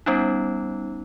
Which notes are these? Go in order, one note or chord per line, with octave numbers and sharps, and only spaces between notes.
G3 B3 C#4 D#4